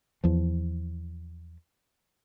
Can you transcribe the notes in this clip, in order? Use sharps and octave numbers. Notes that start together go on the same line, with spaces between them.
E2 F3